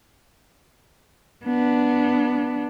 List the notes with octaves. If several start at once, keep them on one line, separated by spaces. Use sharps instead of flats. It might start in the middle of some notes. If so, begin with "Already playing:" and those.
B3 D4